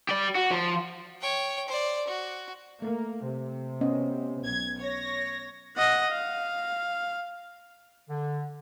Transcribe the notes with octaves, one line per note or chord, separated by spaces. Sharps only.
G4 D5
F#4
F3
C#5 G5
C5 D5
F#4
A3 A#3
C3
B3 C#4 D#5
B1 G#6
C#5 A#6
D#5 F#5
F5
D3